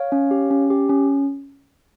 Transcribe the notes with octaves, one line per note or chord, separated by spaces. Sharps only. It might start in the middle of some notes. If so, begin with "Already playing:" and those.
Already playing: C#5 F5
C#4
G4
C#4
G4
C#4